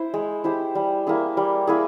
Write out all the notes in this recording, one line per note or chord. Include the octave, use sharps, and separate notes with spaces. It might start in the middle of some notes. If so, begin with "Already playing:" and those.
Already playing: E4 C5
G#3
E4 G4 C5
G3
A#3 E4 G#4
G3
A#3 E4 G#4